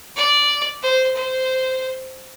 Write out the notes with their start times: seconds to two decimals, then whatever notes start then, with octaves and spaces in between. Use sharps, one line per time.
0.16 D5
0.83 C5
1.16 C5